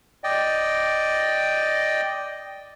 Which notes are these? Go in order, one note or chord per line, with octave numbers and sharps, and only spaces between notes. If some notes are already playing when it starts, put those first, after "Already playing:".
D5 D#5 G5